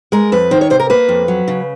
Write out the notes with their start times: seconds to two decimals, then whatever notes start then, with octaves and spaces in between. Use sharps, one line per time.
0.12 G#3 A#4
0.32 F2 B4
0.51 D#3 C5
0.61 C#5
0.70 C3 C5
0.80 A#4
0.90 A#3 B4
1.08 F2
1.28 F#3
1.48 C#3